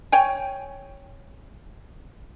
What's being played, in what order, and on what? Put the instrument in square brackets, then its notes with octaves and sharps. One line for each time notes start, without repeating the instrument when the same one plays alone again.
[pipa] C#5 G5 G#5